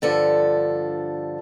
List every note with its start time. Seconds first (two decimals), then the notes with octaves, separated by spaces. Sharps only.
0.02 G2 D3 F3 A4